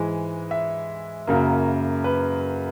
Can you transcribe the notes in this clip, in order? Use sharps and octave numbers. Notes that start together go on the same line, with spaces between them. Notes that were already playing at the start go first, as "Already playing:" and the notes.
Already playing: G#2 E3 G#3
E5
F#2 C#3 F#3 A#3
B4